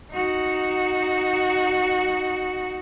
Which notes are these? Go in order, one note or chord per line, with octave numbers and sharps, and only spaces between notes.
D#4 F#4